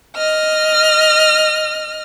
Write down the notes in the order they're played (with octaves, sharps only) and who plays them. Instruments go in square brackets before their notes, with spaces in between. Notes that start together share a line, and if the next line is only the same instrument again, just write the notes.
[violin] D#5 F6